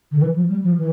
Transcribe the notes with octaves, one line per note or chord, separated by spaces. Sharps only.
D3
E3
F3
G3
F3
E3